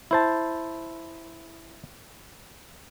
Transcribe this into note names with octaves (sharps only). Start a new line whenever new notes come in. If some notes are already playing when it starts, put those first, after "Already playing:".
E4 C5 A5